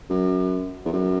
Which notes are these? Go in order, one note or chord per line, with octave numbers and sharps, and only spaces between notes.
F#2
E2
F#2